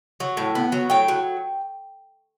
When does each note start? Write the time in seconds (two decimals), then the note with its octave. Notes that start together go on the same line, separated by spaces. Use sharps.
0.20 F#3
0.37 A2
0.55 B3
0.72 F#3
0.90 A2 G5
1.08 F#3